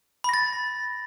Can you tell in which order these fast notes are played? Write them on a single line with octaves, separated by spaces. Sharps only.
B5 A#6 A6